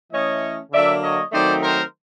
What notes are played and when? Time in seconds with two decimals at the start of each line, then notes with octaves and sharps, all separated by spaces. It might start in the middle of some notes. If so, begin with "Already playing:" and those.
0.11 E3 A3 C#4 C#5 D#5
0.71 D3 F#3 A#3 D4 D5 E5
1.01 C#5 D#5
1.31 D#3 F#3 A3 C4 D#4 C5 D5
1.62 A#4 C5